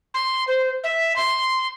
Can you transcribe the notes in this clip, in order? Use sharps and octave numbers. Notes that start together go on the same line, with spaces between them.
C6
C5
E5
C6